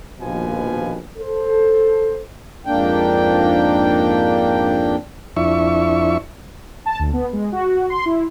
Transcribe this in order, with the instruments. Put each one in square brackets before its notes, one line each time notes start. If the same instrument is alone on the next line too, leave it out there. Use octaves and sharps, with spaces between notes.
[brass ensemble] A#1 D#2 B2 F3 B4 G#5
A4 C5
[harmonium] F2 G#2 A#3 D4 G5
[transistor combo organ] F2 D4 E4 E5 C#6
[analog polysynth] A5
D2
B3
G#3
F#4
C6
E4